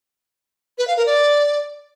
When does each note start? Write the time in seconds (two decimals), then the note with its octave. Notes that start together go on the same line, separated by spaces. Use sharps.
0.78 B4
0.87 F5
0.97 A#4
1.06 D5